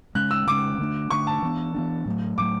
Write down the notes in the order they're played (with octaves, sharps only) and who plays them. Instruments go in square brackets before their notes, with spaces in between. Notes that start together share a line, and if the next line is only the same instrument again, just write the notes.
[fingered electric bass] C#3 G#3 C#4 [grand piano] F#6
[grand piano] E6
[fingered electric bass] C#3 G#3 C#4 [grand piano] D6
[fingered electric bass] D3 A3 D4
[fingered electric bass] D3 A3 D4 [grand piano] C#6
[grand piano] A5
[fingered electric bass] E3 B3 D4
E3 B3 D4
A2 F#3 A3
[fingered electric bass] A2 F#3 A3 [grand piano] D6